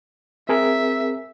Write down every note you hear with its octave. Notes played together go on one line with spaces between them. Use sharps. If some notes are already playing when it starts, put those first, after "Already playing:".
C4 G#4 A#4 E5